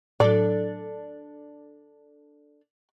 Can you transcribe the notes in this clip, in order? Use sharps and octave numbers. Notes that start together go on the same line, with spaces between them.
A2 F#3 D4 A4 D5